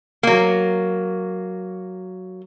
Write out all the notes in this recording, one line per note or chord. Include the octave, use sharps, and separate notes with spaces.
F#3 A#3